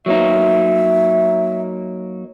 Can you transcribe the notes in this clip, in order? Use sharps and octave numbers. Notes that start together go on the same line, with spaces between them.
F#3 A#3 D#4 E5